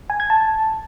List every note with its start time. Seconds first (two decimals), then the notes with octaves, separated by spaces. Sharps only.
0.10 G#5
0.20 G#6
0.30 A5